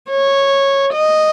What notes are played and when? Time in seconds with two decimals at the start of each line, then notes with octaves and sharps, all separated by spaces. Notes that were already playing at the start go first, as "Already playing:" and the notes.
0.10 C#5
0.93 D#5